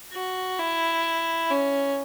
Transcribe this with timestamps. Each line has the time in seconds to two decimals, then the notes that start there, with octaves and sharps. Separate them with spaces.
0.13 F#4
0.59 E4
1.50 C#4